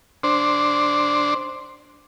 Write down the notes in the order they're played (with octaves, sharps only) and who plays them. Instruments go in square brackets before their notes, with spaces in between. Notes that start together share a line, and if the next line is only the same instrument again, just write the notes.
[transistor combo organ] D4 C5